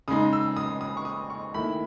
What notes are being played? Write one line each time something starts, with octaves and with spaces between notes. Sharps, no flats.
C#3 G#3 D#4 D#6
E6
D#6
D#6
C#6
D#6
C#6
D#2 D#3 A3 E4 B5